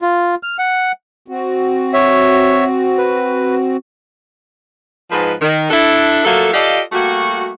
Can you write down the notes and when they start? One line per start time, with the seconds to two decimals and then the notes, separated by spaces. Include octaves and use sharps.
0.02 F4
0.43 F6
0.59 F#5
1.28 C4 F#4
1.93 C#5 E5
2.98 B4
5.12 G#2 F3 G#3 B4
5.41 D#3
5.71 D4 E4 A4
6.25 F3 F#3 A3 A#3 A4
6.53 F4 G4 A4 D5 D#5 F5
6.93 G3 A3 A#3 F#4